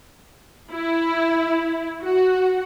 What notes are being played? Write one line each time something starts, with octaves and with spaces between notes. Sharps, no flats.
E4
F#4